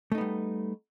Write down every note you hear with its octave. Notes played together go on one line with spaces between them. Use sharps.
G3 A3 B3 D#4